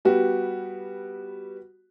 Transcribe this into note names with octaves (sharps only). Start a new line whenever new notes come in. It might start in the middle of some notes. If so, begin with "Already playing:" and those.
G3 B3 F#4 G4